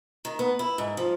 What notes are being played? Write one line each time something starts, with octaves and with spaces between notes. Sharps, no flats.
D#3
B3
E4
G#2
F3